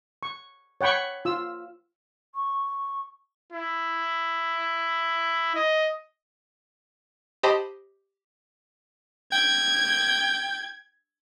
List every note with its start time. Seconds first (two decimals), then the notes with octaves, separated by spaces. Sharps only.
0.23 C#6
0.81 C#5 F#5 G5 B5 C#6
1.25 F4 E6
2.35 C#6
3.53 E4
5.56 D#5
7.43 G4 C5 D#5 A5 B5
9.32 G5 G#6